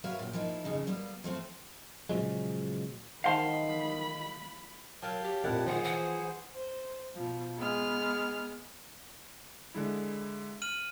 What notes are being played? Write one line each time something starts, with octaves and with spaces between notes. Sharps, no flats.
F#4 A#4 B4 C#5 E5 F5
A#2 G5
F3 A#3 D#4 E4
F2 C#3 D#4
G3 A#3 B3
F3 A3 C4 C5
A#2 C#3 F3 F#3 G#3
D#3 C5 F5 F#5 A5 B5 C6
F#3 A#4 F5 G5 A5
G4
F2 A#2 E4 A#4 F#5 A5
F#2 D#3 F3 G#4 C5 F#5
E3 F#5
C5
B2 F3
G#3 B3 F6
D3 G#3 E4
F6 D#7 F#7